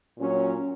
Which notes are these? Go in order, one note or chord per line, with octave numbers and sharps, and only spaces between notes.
A#2 F#3 C#4